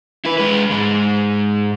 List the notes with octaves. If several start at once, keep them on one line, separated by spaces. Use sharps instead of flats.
E4 B4
G#3 B4
G#2 G#3